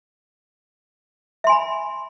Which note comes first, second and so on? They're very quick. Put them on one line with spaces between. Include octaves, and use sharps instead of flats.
E5 C6 G#5 B5